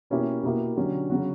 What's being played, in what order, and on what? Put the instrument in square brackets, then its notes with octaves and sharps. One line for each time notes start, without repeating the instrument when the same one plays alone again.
[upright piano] B2 A#3 C#4 E4 G4
B2 A#3 E4 G4
D3 F#3 C#4 G4
C#3 F#3 C#4 F#4